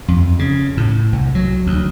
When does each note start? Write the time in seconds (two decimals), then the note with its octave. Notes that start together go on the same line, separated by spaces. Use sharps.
0.08 F2
0.39 C#3
0.77 A2
1.13 C2
1.35 F#3
1.67 D2